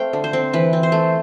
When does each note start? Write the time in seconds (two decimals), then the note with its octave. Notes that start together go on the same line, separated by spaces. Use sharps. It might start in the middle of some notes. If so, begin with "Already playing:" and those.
Already playing: A3 C4 F5 G5
0.13 D3
0.24 C5
0.33 C4
0.53 E3 B4
0.73 C4
0.83 C5
0.92 A3